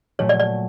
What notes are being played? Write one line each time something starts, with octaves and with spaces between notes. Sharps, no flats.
A#2 F#3 A3 C#5
D5
D5